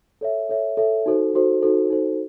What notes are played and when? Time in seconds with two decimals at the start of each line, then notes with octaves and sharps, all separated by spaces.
0.21 A4 C#5 E5
0.49 A4 C#5 E5
0.77 A4 C#5 E5
1.06 D#4 F#4 A4 C5
1.34 D#4 F#4 A4 C5
1.62 D#4 F#4 A4 C5
1.90 D#4 F#4 A4 C5